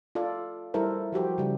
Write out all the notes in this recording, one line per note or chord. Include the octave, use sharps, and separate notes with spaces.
F4 A4 D5
G3 E4 A4 A#4 C5
F3 F#4 G4 C5
C#3 G3